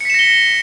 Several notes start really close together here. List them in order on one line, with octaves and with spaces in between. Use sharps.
C#7 B6 E7 A#6 G7